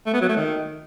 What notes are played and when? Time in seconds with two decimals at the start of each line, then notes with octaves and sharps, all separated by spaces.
0.06 A3
0.14 B3
0.21 F#3
0.29 A3
0.37 D#3